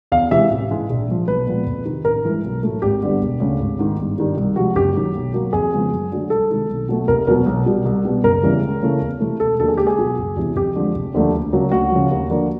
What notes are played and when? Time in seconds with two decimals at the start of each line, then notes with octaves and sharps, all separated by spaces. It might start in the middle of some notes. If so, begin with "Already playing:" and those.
0.12 E2 F5
0.31 C3 E3 G#3 E5
0.50 A1
0.70 G#2 E3 G#3
0.90 A#1
1.08 A#2 F3
1.28 B1 B4
1.47 A#2 F3 G#3 B3
1.66 F2
1.85 C3 D#3
2.05 A1 A#4
2.24 G2 E3 G#3
2.44 B1
2.63 A2 F#3 A3
2.82 G#1 G4
3.02 G2 D3 G3 B3
3.21 E1
3.40 D2 C#3
3.60 G#1
3.79 G#2 D#3
3.99 G1
4.18 G2 D#3 G3
4.37 C2
4.56 C3 F3 G#3 F#4
4.75 F#1 G4
4.95 F#2 D#3
5.15 B1
5.34 B2 F#3 A#3
5.53 F2 G#4
5.72 C#3 F3 G#3 B3
5.92 F#2
6.12 D3 F#3 A3
6.30 C2 A4
6.50 C3 D#3 G#3
6.69 B1
6.89 B2 F#3 A3
7.08 F1 A#4
7.27 E2 B2 F#3 B3 A#4
7.46 B1
7.66 B2 G3
7.85 C2
8.05 B2 G3 B3
8.24 F#1 A#4
8.43 E2 C#3 E3 G3
8.63 C#2
8.83 C#3 E3 A3
9.01 E2
9.20 C3 E3 A3
9.40 E1 A4
9.59 D#2 D3 F#3 A#3 A4
9.68 G#4
9.77 C#2 G4
9.87 G#4
9.98 B2 F#3
10.18 F#1
10.36 E2 C3 E3
10.56 F2 G4
10.75 D3 F3 G#3
10.95 F1
11.14 D#2 D3 F3 A3
11.33 D2
11.53 C#3 F#3 A#3
11.72 D2 F#4
11.92 C#3 F3
12.11 D#2
12.30 D3 F3 A#3